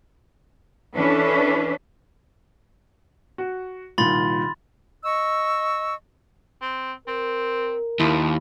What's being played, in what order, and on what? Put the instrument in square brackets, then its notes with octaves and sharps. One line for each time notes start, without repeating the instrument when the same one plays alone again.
[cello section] E3 C#4 D4 A4 B4
[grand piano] F#4
[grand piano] C2 A#2 D#3 [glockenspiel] B5 C6 A6
[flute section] D#5 C#6 E6
[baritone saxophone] C4
[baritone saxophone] C4 [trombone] A#4
[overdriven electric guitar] D#2 [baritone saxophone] F3 [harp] E4